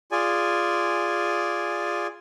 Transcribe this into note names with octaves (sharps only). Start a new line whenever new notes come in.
F4 G#4 D5 G#5